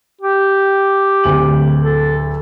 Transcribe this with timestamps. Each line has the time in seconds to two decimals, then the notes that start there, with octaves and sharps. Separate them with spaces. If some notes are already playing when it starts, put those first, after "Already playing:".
0.21 G4
1.24 D1 D2 F#7
1.84 A4